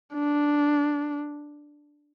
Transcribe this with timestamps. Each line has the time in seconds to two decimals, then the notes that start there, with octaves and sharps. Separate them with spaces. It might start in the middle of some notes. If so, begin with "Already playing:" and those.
0.14 D4